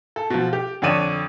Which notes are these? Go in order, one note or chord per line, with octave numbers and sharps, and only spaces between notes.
A4
B2 F3
G4
F2 D3 C#5 D5 D#7 E7